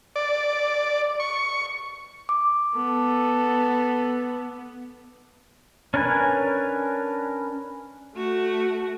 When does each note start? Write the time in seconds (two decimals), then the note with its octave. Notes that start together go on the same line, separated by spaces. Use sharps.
0.16 D5
1.20 C#6
2.29 D6
2.76 B3 A4
5.94 C#4 D4 A#4 B4 G#5
8.15 A3 F#4